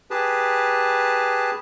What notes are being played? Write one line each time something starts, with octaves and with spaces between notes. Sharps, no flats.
G4 G#4 B4 A5